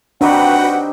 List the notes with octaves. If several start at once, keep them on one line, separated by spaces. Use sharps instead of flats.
C4 D4 D#4 F#4 G4 B4 F#5 G5